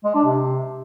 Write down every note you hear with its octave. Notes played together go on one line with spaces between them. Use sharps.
G#3
D4
C3